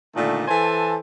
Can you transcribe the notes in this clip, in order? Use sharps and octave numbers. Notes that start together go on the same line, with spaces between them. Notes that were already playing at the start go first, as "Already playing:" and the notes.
A#2 D3 D#3 A3
E3 A4 C5 G#5 A5